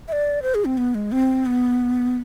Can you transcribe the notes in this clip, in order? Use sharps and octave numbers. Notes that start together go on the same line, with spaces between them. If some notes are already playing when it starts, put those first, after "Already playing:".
E5
D5
C5
G#4
C4
B3
G#3
C4
B3